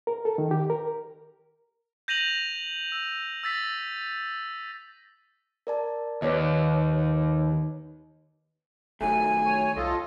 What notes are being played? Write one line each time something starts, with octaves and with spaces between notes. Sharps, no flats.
A#4
A4
D#3
G4
A#4
G6 A#6 D#7 F7 F#7
E6
E6 A6 B6
A#4 D5 A5
D#2 B4 C#5 D#5
F1 D#3 F#3 A3 G#5
C#5
C2 F4 A4 D#5